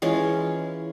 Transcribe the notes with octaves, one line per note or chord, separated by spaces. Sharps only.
E3 G#3 C#4 F4